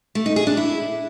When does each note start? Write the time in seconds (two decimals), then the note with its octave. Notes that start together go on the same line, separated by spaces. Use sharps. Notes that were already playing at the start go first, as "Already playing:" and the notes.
0.15 A3
0.26 D#4
0.36 G#4
0.47 D4
0.57 E4